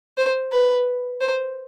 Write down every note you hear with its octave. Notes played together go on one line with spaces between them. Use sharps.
C5
B4
C5